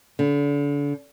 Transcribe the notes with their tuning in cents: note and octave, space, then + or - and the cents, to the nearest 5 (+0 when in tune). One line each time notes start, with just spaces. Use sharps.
D3 -35